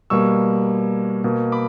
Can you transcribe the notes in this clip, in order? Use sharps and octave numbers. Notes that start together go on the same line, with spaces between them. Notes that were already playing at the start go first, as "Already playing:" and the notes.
B2 G3 A#3 C#6 E6
B2 A#3
B5 D6